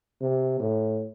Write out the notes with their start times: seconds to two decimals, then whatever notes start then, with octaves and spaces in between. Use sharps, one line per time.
0.21 C3
0.60 A2